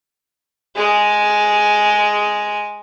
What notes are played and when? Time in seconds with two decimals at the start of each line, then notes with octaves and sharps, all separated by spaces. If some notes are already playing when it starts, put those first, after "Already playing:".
0.75 G#3 G#4